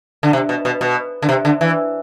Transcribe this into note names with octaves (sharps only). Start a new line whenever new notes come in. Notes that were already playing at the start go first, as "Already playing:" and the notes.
D3
C3
B2
B2
B2
D3
C3
D3
E3